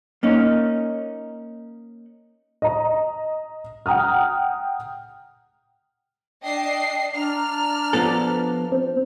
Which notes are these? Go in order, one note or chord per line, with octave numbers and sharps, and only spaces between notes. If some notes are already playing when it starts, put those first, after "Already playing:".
A#3 C#4 D#4
D#5 A#5
F#5 G5 A#5 D#6 F6
D4 D#5 G5 C7
D4 A#5 F6
F3 B3 A4
C4